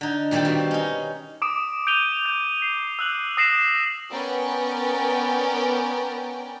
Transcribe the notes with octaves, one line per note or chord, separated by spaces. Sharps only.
D3 D#4
A#2 D#3 G3 C4 G4
B2 D#3 C4
C#4 D#4
D6 D#6 D7
G6 D7 D#7 F7 G7
G6
C7
E6 F#6 F#7
D#6 E6 A#6 C7 D7 E7
B3 C#4 A#4 D5 G5